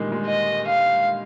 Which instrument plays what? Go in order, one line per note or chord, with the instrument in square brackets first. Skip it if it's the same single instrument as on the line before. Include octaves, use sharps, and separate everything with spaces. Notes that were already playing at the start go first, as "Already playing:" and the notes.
Already playing: [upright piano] A#2 D3 D#3 G3 G#3
G#3
[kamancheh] D#5
F5